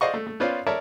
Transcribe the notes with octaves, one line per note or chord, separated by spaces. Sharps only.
C5 D5 D#5 F5 F#5 C#6
A3
A3
B3 C#4 F4 C5 D5 F5
A#4 C#5 D5 E5 A5